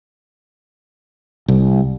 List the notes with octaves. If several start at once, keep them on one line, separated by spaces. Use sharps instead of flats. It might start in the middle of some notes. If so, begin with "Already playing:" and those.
C2